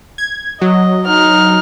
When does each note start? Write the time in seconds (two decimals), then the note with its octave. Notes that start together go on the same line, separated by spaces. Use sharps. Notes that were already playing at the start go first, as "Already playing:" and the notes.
0.18 G#6
0.61 F#3 D#5
1.07 D#4 F6